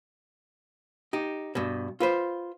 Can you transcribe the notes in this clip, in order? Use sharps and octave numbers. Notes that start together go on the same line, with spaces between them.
D#4 G4
G2 B2
F4 B4 C5